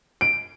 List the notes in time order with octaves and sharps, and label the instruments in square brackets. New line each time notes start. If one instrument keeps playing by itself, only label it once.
[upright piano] D7